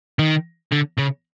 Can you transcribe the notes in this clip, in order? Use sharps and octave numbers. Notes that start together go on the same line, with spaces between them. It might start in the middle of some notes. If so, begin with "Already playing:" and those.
D#3
D3
C#3